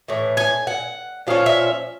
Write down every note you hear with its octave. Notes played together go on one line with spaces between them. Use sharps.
A2 E3
G#5
F#5
A#2 F3 C#4 F5
E5